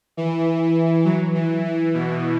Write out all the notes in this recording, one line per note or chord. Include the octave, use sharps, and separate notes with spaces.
E3
F#3
E3
E3
B2